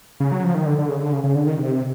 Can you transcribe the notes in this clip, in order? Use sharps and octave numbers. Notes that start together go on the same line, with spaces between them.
C#3
F#3
F3
D#3
D3
D3
C#3
D3
C#3
C#3
D3
D#3
C3